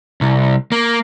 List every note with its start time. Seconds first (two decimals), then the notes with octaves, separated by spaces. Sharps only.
0.21 C2
0.72 A#3